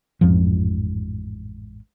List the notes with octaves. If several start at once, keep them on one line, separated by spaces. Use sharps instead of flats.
A1 F2 G#2 F3